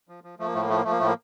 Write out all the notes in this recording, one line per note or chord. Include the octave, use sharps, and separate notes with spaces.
F3
F3
F3 A3
A#3
A2 A3
A#3
F3 A3
A#3
F3 A3
A#3
A2 A3
A#3